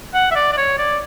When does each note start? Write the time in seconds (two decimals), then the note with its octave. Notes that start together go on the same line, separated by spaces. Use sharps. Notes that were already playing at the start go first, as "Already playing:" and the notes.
0.14 F#5
0.31 E5
0.35 D5
0.53 D5
0.57 C#5
0.78 D5